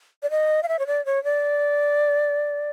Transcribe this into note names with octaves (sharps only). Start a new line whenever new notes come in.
D5
D#5
F5
E5
C#5
D5
C#5
D5